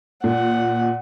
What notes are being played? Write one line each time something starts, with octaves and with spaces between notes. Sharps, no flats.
A#2 F#5